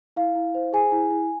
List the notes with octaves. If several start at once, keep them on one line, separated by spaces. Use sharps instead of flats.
E4 F5
E4
C5
G#4 G#5
E4
E4